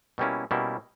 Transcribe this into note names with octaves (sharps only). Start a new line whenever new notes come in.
B2 G3 A#3 C#4 E4
B2 G3 A#3 C#4 E4